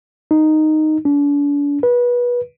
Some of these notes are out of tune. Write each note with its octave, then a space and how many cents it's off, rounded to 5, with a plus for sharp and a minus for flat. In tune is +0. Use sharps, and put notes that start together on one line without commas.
D#4 -5
D4 -40
B4 -25